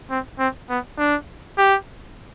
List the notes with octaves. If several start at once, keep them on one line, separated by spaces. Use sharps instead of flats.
C4
C4
B3
D4
G4